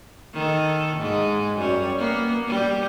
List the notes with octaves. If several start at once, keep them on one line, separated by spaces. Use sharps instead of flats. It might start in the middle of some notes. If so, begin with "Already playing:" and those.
D#3 A4
G#2 G#3
F#2 G3 C#5
A#3 B3
G3 G4